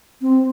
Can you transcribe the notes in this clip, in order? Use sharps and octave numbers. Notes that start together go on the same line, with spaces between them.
C4